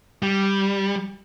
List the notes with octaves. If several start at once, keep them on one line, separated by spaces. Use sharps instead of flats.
G3